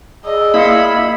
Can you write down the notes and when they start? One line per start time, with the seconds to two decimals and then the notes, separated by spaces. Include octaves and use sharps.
0.25 G#4 D5 D#5 E6
0.54 A#3 E4 F5 B5 C#7